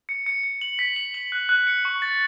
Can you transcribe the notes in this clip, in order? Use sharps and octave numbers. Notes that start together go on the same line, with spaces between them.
C#7
C#7
C#7
F#7
B6
F#7
F#7
F#6
F#6
C#7
C#6
A6